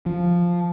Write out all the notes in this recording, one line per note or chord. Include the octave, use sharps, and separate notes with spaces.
F3